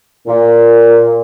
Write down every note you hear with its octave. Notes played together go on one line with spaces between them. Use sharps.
A#2